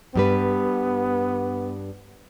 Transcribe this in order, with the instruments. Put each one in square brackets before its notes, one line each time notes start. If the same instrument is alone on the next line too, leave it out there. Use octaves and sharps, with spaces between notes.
[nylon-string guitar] G2 G3 B4 [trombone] B3